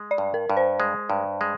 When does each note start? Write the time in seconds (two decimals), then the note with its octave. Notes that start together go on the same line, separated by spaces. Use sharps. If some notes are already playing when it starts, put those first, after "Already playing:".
Already playing: G#3
0.11 D5
0.18 G2
0.34 A#4
0.50 G2
0.57 C5
0.80 G#3
1.10 G2
1.41 G#3